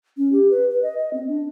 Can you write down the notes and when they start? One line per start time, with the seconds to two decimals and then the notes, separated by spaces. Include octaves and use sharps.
0.17 C#4
0.32 G4
0.51 B4
0.70 B4
0.83 D#5
0.98 D#5
1.13 C4
1.28 D4